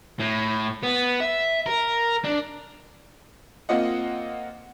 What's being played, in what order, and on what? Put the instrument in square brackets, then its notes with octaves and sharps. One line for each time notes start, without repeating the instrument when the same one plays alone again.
[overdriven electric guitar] A2
B3
E5
A#4
D4
[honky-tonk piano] A#3 C4 F4 D#5 F#5